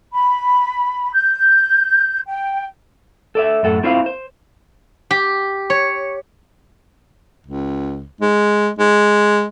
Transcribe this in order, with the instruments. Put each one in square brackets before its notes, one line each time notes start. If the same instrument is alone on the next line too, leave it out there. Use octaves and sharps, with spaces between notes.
[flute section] B5
G6
G5
[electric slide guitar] A4 D5 E5
F#2 A2 A4 F#5
C4 E4 F4 C5 D5 F5
C5
[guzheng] G4
C#5
[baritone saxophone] C#2
G#3
G#3